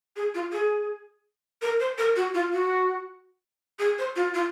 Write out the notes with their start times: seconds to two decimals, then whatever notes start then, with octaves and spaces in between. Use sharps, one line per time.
0.16 G#4
0.34 F4
0.52 G#4
1.61 A#4
1.80 C5
1.98 A#4
2.16 F#4
2.34 F4
2.52 F#4
3.79 G#4
3.98 C5
4.15 F4
4.34 F4